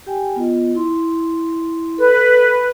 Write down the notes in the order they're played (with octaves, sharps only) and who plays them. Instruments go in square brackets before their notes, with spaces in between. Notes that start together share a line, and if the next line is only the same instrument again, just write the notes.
[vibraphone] G4 G5 G#5
B3 F4 D#5
E4 C6
[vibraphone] A4 [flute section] B4